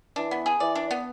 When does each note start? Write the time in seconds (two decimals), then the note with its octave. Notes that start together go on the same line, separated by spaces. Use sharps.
0.16 E3 D4
0.31 B3
0.46 G#4
0.60 E3 D5
0.75 D4
0.91 B3